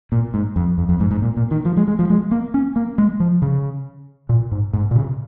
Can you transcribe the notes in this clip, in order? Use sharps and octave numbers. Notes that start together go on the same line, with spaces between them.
A#2
G#2
F2
F2
F2
G#2
G#2
A#2
A#2
D#3
F3
G#3
G#3
F3
G#3
A#3
C#4
A#3
G#3
F3
C#3
A#2
G#2
G#2
A#2
C#3